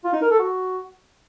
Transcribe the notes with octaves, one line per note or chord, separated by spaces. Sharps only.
F4
D#4
A#4
A4
F#4